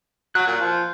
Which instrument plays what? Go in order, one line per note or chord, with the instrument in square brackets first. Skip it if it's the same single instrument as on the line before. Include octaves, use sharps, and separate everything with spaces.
[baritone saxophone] F#3 [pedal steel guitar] F#6
[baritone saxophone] A#2
F3